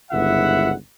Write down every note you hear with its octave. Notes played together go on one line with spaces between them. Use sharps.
G1 C#2 G#2 E4 E5 F#5